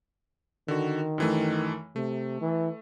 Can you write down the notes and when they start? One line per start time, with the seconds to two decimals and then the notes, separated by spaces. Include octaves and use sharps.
0.68 D3 D#3 F#4
1.18 F#2 E3 A3
1.96 C3 A3
2.41 E3